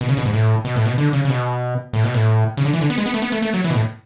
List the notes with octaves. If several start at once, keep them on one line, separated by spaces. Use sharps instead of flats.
B2
C#3
B2
G#2
A2
B2
A2
B2
D3
C#3
C#3
B2
A2
B2
A2
C#3
D3
E3
D3
B3
G#3
B3
A3
B3
A3
A3
F#3
E3
B2
A2